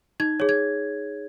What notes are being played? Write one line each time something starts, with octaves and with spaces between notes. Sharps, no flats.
D#4 G#6
G#4 C#5
G#6